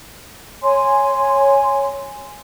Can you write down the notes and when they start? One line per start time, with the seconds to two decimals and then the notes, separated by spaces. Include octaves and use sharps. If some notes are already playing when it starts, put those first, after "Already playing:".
0.62 C#5 G#5 C6